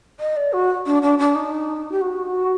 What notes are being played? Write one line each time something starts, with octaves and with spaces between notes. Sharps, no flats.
D#5
D5
F#4
D4
D4
D4
D#4
G4
F#4